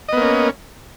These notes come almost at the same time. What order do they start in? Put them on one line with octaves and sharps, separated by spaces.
D#5 B3 A#3 C#4